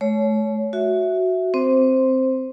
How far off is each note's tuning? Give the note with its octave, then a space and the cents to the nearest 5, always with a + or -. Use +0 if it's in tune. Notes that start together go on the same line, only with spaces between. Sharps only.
A3 -40 C#5 +15
F#4 +0 E5 +0
C4 +0 C5 +0